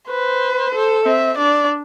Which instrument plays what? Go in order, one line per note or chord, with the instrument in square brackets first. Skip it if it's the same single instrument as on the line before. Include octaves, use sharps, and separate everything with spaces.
[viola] B4 [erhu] C5
[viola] A4
[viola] C4 [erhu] E5
[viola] D4 [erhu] D5